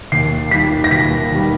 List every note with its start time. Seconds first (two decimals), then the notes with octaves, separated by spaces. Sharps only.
0.12 D#2 C7
0.51 D#3 G3 B6
0.84 A#6
0.91 D#2 B6
1.32 D#3 G3